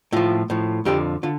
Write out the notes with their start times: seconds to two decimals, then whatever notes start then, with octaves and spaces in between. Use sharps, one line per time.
0.12 A2 F3 F4
0.50 A2 F3
0.85 F2 D3 F3 G4
1.23 D3 F4